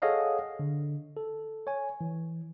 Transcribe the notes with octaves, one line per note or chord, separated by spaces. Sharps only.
G#4 A4 C#5 D#5 F5 F#5
D3
A4
C#5 G#5
E3